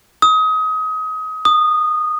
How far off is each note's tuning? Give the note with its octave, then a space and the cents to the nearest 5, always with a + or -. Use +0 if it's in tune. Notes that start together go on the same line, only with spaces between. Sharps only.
D#6 +25
D#6 -15